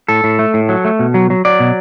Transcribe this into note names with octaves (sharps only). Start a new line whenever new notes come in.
A2 A4
A2
A3
A2
F#3
A3
B2
F#3
F#3
F#3 D5
B2